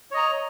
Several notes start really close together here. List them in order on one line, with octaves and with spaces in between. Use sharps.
C#5 D#5 A#5